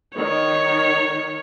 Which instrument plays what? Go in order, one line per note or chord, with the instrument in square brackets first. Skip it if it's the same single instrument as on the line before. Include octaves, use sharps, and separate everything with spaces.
[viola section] D#3 [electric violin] C#5